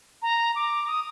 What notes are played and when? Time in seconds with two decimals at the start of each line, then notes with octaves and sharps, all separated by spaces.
0.22 A#5
0.56 D6
0.88 D#6